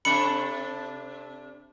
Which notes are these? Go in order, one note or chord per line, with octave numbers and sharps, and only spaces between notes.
C3 D4 A4 B5 C#7